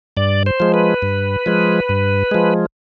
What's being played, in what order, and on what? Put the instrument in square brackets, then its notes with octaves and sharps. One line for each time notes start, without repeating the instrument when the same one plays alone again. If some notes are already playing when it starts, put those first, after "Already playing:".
[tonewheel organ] G2 D5
C5
F3 G#3
B4
G2
F3 G#3
G2
F3 G#3